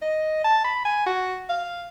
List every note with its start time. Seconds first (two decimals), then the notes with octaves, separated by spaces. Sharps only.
0.02 D#5
0.44 A5
0.64 B5
0.85 G#5
1.06 F#4
1.49 F5